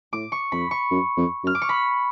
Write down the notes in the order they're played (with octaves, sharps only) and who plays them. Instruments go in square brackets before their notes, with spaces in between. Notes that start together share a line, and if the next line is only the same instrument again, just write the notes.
[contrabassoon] A2 [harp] D6
[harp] C#6
[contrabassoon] F2 [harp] B5
[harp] C#6
[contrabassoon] F#2
F2
F#2
[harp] F6
D6
C#6
B5